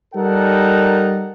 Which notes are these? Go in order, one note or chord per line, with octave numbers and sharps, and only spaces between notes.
G3 D#4 A4 A#4 F#5